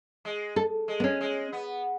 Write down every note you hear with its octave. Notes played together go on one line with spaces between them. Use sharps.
G#3
A4
G#3
B3
C#4
G#3
B3